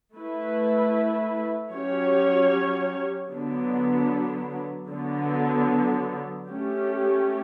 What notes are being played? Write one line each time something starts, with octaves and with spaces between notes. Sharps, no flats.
A3 E4 B4
F#3 C#4 G4 C#5
D3 F#3 B3 D4
D3 F#3 B3
A3 C#4 G4